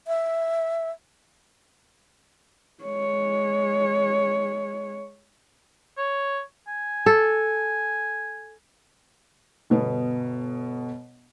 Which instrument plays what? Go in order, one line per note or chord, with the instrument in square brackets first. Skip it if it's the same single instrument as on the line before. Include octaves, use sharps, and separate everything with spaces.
[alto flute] E5
[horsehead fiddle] G#3 C#5
[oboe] C#5
G#5
[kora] A4
[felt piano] G1 B2 B3